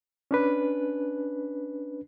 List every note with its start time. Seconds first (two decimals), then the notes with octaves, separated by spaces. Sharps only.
0.31 C#4 D4 B4